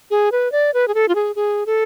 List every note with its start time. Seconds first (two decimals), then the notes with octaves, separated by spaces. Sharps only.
0.11 G#4
0.32 B4
0.52 D5
0.74 B4
0.88 G#4
0.94 A4
1.08 F4
1.15 G#4
1.36 G#4
1.66 A4